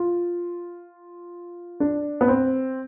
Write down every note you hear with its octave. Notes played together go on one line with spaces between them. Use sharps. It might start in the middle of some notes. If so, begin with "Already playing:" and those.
Already playing: F4
D4
B3
C4